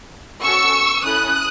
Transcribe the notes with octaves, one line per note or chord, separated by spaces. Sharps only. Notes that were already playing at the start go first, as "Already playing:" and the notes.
C#4 F#4 A4 C#6 E6
C#4 E4 A4 D#6 F#6